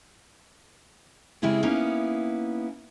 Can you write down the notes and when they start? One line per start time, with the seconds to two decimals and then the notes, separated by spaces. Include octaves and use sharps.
1.42 C#3 G#3 C4 E4 G4 G#4
1.63 A#3 B3 C#4 D#4 E4